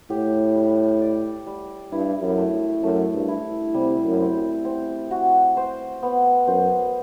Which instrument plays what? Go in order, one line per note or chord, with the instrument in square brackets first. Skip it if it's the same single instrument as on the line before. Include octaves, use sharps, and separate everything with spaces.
[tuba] A2 [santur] G4
[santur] G3
D5
G3
[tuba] G2 [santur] E4
[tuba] F#2
[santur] A3
[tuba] F#2 [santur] A3
[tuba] G2
[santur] E4
[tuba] C3 [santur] G3
[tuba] F#2
[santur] C4
C4
F#4
C5
B3
[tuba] F#2 [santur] C5